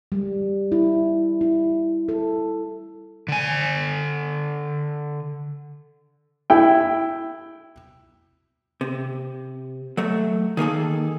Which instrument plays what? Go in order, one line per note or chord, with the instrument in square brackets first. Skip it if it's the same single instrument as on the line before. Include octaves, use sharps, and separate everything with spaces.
[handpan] G3
E4
E4
A4
[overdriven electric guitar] D3 G#5
[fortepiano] E4 G5
[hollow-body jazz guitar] C3
F#3 A3
D#3 A#3 G#4 A4